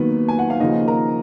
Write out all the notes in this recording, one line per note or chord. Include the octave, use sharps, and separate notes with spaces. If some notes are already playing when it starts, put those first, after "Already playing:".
Already playing: D#2 D#3 F#3 A#3 B3 B4
G#5
F#5
F5
D#2 C#3 F3 A#3 D#4 D#5
A#4 A#5